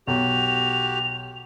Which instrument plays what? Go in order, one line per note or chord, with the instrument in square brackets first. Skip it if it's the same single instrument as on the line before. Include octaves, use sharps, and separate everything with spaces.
[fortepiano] B1 [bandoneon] F#4 G4 [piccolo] F7